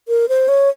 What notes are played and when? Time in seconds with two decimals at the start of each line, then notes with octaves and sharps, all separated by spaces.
0.08 A#4
0.29 C5
0.48 C#5